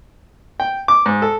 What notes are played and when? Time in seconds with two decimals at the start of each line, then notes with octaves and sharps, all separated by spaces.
0.60 G5
0.88 D6
1.06 G#2
1.22 A4